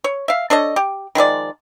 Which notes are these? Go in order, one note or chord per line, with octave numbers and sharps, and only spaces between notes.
C#5
E5 F5
D4 A4 C#5 D#5
G4
D#3 F3 G#3 D5